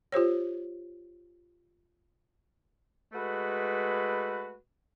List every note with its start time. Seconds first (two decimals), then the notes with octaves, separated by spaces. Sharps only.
0.12 F4 G4 C5 C#5
3.13 G#3 A3 F#4 B4